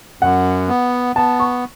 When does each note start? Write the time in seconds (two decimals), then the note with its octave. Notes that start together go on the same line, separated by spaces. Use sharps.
0.21 F#2 F#5
0.69 B3
1.16 B3 A5
1.40 C#6